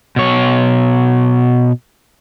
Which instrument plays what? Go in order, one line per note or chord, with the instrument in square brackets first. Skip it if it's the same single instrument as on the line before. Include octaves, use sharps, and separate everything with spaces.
[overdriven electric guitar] B2 C#5